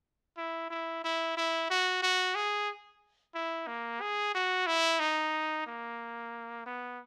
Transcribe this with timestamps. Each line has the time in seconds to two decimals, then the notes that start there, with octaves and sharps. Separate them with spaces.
0.37 E4
0.70 E4
1.04 E4
1.37 E4
1.70 F#4
2.02 F#4
2.35 G#4
3.35 E4
3.67 A#3
4.01 G#4
4.35 F#4
4.67 E4
5.00 D#4
5.66 A#3
6.66 B3